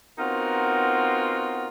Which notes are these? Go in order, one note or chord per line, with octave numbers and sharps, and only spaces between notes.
B3 C4 D#4 F4 F#4 A#4